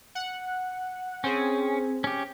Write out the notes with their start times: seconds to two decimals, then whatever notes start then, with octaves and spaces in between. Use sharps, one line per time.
0.15 F#5
1.24 C4 C#4 G#4
2.04 C#4 G4